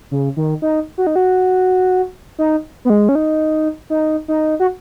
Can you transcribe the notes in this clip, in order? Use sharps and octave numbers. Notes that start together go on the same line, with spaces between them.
C#3
D#3
D#4
F#4
D#4
F#4
D#4
B3
G#3
C#4
D#4
D#4
D#4
F#4